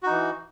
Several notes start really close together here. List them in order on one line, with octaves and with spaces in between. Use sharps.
F#4 D#4 E3